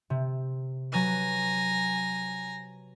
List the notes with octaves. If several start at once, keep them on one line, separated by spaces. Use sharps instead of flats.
C3
F#3 B4 G#5 A#5